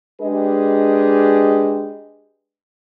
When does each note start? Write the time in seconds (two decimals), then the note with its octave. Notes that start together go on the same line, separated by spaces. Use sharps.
0.21 G#3 D4 G4 G#4 B4 D#5